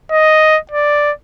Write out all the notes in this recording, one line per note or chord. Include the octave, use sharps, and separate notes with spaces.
D#5
D5